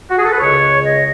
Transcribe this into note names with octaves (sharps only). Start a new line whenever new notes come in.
F#4
G#4
A4
B4
C#2 C#3 G#3 C#5
D#5